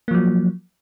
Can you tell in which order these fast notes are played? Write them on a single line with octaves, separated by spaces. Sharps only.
A#3 F3 F#3